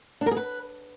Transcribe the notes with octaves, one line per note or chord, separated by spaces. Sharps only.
D4
A#4
G#4
B4